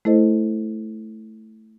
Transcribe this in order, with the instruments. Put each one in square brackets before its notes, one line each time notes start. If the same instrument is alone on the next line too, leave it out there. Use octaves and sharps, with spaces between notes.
[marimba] A3 E4 A4 C5 D#5